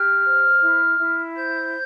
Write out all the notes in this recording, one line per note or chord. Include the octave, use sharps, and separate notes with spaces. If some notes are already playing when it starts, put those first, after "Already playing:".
Already playing: G4 F6
C5
E4
E4
C5 G6